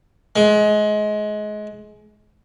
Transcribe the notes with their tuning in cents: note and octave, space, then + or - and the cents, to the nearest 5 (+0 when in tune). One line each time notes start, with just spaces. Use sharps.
G#3 +25